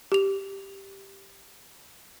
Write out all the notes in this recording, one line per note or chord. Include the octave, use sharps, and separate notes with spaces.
G4 F7